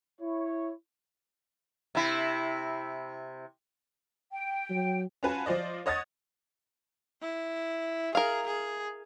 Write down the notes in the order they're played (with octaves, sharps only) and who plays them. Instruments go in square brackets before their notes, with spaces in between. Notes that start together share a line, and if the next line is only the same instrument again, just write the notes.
[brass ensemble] E4 C#5
[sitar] C3 E4
[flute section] G5
[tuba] F#3
[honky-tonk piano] C#4 F4 F#4 B4 G#5 A5
F3 F4 C5 D5 D#5
C#5 D#5 F#5 D#6 G#6 A6
[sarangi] E4
[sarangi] G#4 [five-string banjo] A#4 F5
[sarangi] G#4